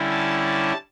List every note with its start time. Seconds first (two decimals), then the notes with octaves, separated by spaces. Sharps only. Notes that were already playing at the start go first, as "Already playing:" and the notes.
Already playing: D3 G3 C#4 E4
0.11 A5